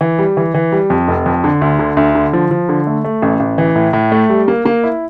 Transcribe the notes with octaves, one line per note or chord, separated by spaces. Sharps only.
E3
G3
E3
E3
G3
F2
F1
F2
D3
D2
D3
D2
D3
F3
F3
D3
A3
A3
A1
A1
E3
A2
A2
A3
G3
A#3
A#3
E4